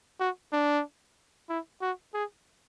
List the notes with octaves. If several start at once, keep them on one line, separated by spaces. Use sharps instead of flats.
F#4
D4
E4
F#4
G#4